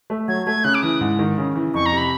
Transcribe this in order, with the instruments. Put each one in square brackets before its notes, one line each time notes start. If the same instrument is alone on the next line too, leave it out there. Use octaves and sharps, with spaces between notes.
[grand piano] A3
[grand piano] F#3 [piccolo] G#6
[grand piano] A3 [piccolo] G#6
[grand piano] C#3 [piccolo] F#6
[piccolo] D6
[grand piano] E3 [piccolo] D#6
[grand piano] G#2
D#3
C#3
E3
[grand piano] F2 [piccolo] C#6
[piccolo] A#5
[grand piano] C3
[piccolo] B5